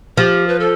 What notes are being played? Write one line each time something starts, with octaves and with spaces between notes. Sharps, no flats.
F3 G4
B4
A4